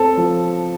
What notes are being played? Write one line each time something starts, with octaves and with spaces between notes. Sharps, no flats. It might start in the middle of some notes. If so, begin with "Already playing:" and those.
Already playing: C4 A4
F3